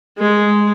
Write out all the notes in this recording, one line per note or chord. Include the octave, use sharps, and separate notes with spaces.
G#3